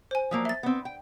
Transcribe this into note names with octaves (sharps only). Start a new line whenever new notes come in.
C5 G#5
F3 F#3 A#3
E5 A6
B3 C4
G5